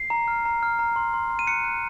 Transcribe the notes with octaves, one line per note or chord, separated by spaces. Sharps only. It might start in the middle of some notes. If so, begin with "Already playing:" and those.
Already playing: C7
A#5
F6
A#5
F6
A#5
C6
C6
C6
D#7
F#6 C#7
F#6